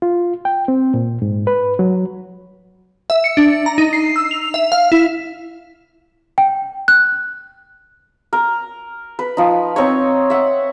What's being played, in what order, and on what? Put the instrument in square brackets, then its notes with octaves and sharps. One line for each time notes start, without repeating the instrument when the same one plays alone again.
[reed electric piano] F4
G5
C4
A#2
G#2
B4
F#3
[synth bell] E5
C#7
D4
A#5
D#4
C7
E6
F7
E5
F5
E4
[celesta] G5
F#6
[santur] A#4
B4
F3 D#4
C4 D#4 C#5
E5 F#5